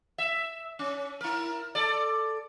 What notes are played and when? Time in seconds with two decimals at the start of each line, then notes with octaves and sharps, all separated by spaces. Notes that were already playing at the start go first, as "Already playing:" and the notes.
0.18 E5
0.79 C#4
1.21 E4 A#4
1.75 A4 D5